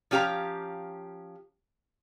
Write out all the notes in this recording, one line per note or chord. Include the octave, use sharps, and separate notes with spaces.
F3 C#4 G4 F5 A#5